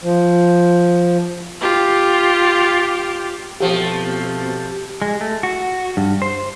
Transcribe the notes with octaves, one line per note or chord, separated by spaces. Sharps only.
F3
F4 G4
B2 F3 A3 C4 G4
G#3
A3
F#4
G2
C5